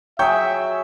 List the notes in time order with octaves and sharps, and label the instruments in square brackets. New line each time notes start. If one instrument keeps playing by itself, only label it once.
[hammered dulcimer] F#3 G#4 [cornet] E5 [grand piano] G5 C#6 G6